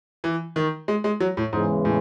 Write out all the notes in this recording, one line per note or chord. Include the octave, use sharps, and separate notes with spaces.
E3
D#3
G#3
G#3
F#3
A2
E2 G#2 C#3 E3 G#3
A2